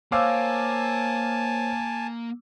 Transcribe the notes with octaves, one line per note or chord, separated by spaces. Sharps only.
A#3 C5 C#5 F5 G#5 A5 D6 E6